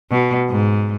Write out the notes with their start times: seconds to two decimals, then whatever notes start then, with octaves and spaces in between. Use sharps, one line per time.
0.12 B2
0.50 G#2